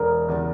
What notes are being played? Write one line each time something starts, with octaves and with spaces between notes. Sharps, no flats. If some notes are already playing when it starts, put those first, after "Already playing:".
Already playing: E1 A#4
E2 C#3